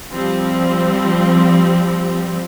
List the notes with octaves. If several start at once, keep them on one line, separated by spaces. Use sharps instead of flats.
F3 G3 C4